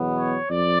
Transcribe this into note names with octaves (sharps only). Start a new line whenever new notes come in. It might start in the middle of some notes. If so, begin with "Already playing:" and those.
Already playing: E2 B2 F#3 B3
C#5
F2 D5